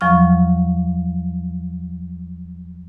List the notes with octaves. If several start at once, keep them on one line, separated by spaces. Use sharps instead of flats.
E2 F3 F#3 C#6 F6